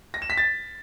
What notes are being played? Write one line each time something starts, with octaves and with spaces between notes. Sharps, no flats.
A#6
E7
B6
A6